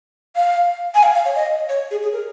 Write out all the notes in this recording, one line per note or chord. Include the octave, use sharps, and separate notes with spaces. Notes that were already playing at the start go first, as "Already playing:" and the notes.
F5
G#5
F5
F5
C#5
D#5
C#5
G#4
G#4
A#4